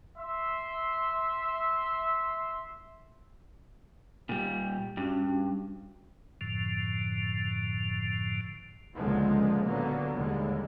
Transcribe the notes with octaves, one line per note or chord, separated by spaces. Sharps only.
E5 C6
A#2 G3
G2 C#4 D4 F#4
F#2 A2 D3 F3
C#2 A#2 D3 F3 G#3 B3
A#2 D3 F#3 A#3 B3
D#2 D3 G3 G#3